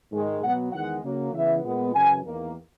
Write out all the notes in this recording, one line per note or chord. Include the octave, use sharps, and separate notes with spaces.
G#2 D#3 G#3
B2 F#3 B3 F#5
E2 D#3 G#3 F#5
C#3 F#3 A#3
C#3 E3 B3 E5
A#2 G#3 B3
F#2 C#3 E3 G#5
E2 D#3 A#3